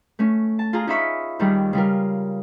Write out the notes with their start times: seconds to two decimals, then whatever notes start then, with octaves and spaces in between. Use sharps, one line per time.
0.19 A3 C#4
0.59 A5
0.73 F4 G#4 A#5
0.87 C#4 D#4 F4 E5 B5 C#6
1.39 D#2 D#3 G3 G#4
1.73 C#3 G3 F4 A#4